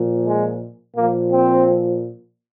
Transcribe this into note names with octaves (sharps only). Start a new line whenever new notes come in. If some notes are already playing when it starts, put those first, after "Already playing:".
Already playing: A#2 F3
G#3
A#2 F3 A#3
C4